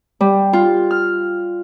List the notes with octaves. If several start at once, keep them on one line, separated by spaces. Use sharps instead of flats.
G3
F4
F6